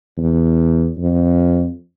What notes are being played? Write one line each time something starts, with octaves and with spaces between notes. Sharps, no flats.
E2
F2